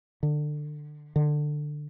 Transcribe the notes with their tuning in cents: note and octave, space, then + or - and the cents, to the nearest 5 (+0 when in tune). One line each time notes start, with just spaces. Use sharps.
D3 +25
D3 +15